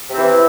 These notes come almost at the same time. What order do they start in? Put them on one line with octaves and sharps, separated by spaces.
C3 C4 E3